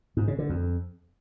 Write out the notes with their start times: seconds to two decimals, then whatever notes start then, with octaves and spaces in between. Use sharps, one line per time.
0.17 G#2
0.28 C#3
0.39 D3
0.49 F2